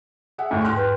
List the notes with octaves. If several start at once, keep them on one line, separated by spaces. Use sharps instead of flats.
G#4 E5 F#5
D2 A2 D3
E2 G#2 G5 C6 F6 F#6
B4 G6